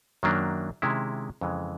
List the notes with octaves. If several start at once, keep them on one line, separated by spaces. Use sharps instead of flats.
F#2 D#3 F#3 A#3 D4
C3 D#3 G#3 C#4 E4
F2 C#3 E3 G#3